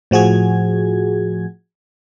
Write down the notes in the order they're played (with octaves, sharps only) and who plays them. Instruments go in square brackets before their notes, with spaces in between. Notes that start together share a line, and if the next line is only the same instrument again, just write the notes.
[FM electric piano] A2 F3 F#4 G#4 G#6